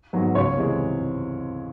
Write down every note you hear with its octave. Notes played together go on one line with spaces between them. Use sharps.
G#2 D#3 F#3 B3
C#2 C#5
C3 E3 G#3